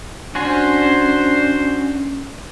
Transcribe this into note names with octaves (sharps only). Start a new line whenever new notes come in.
C#4 D4 F#4 C5 G#5 C6